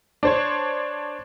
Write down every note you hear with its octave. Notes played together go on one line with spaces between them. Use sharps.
D4 C5 C#5